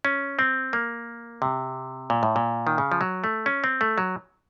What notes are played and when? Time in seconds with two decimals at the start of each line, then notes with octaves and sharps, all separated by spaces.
0.05 C#4
0.39 C4
0.73 A#3
1.42 C3
2.10 A#2
2.23 A2
2.36 A#2
2.67 D#3
2.78 C#3
2.92 F3
3.01 F#3
3.24 A3
3.46 C#4
3.64 C4
3.81 A3
3.98 F#3